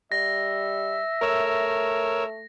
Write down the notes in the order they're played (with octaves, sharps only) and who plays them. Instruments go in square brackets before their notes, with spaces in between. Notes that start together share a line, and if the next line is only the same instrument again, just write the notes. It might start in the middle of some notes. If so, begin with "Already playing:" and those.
[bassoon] G3 [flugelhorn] E5 [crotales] A#6
[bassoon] A3 [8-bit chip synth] A#4 C#5 E6